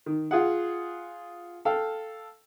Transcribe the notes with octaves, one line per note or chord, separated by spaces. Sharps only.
D#3
F4 G#4 F#5
A4 F5 G5